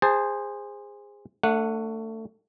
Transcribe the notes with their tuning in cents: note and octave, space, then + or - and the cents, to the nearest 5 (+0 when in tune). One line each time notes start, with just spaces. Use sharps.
G#4 -20 C5 +0 A5 +15
A3 +25 D4 +0 F#5 -10